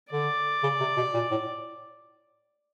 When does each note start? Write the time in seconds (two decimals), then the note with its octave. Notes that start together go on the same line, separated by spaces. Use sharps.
0.12 D3 D5
0.63 C#3
0.80 C3
0.97 B2
1.14 A#2
1.31 A2